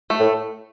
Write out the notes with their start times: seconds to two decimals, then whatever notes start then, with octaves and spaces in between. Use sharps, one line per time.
0.10 A3
0.18 A2